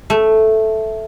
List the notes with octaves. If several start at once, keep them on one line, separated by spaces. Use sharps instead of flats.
A3